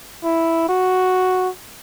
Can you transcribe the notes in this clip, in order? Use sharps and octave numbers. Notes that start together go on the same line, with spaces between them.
E4
F#4